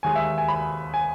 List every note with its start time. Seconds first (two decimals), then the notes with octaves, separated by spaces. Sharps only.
0.03 D#2 D#3 G#3 G#5
0.15 E5
0.38 G#5
0.48 B5
0.94 G#5